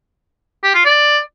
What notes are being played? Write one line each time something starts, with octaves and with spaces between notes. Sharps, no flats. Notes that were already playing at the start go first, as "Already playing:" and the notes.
G4
F4
D5